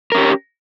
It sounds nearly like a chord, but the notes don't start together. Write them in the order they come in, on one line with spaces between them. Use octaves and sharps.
A#4 C#4 G4